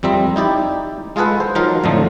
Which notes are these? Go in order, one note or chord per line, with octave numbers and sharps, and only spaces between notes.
F2 G3 C4 E5 A#5
D#4 E4 G4 D5
G#3 F4 G#4 A4 B4 F#5
C5
F3 F#3 D#4 F4 A#4
F2 A2 D3 F3 A3